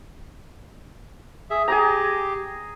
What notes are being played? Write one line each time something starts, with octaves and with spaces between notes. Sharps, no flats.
G#4 E5
G4 G#4 G#5 A#5